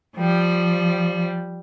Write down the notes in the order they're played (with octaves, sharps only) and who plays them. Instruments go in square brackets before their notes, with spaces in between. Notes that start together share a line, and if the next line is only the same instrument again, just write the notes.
[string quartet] F3 G3